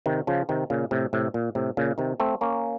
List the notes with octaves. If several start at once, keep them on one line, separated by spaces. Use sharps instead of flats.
C3 D#3
C#3 F3
C3 D#3
A#2 C#3
A2 C3
A2 C3
A#2
A2 C3
A#2 C#3
C3 D#3
A3 C4
A#3 C#4